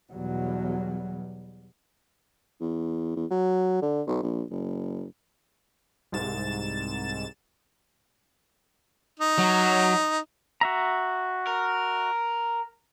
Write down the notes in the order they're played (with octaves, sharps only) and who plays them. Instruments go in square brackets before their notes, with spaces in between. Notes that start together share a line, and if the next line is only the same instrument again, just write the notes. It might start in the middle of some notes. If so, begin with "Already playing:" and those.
[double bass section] E2 B2 F#3 G3
[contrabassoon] E2
E2
F#3
D3
B1
A#1
F#1
[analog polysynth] C2 G#2 A6 E7
[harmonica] D#4
[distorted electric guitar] F#3
[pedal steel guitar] F#4 E5 A#5
[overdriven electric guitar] A#4